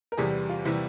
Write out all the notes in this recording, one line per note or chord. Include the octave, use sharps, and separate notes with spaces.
A#4
E2 C3 E3 G3 G#4
F4
C3 E3 G3 E4